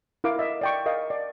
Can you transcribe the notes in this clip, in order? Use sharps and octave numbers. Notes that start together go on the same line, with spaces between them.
E4 A#4 F5 D6
D#5 E5
D5 G5 C#6
A#4 D#5 F5
D5